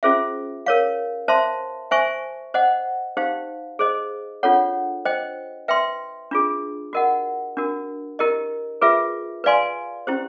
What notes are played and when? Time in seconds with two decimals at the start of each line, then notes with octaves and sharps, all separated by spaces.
0.03 C#4 F4 G#4 C5 E5
0.66 A#4 C#5 F5
1.28 C5 E5 A5 C6
1.91 C5 E5 G#5 C#6
2.54 C5 D#5 F#5
3.17 D#4 G4 C5 F5
3.79 G#4 C5 D#5
4.43 D4 F4 A4 C#5 F#5
5.05 C5 D#5 G5
5.68 B4 E5 G5 C6
6.31 D4 F4 G#4
6.93 F#4 A#4 D#5 F#5
7.57 D4 F#4 A#4
8.19 E4 G4 A#4 D#5
8.81 F4 G#4 B4 E5
9.44 B4 D5 F5 G#5 C6
10.07 C#4 E4 G4 C5